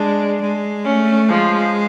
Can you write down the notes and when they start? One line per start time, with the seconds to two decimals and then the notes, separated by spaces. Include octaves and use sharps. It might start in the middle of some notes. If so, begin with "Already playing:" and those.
Already playing: G#3 D4
0.41 G#3
0.85 A3 C#4
1.29 F3 G#3